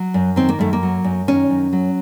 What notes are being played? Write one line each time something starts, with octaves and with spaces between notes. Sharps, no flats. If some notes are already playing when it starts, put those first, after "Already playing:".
Already playing: F#3
F#2
D#3 C4
A#3
F#2 A3
A#3
F#3
F#2
D#3 C#4
F#2
F#3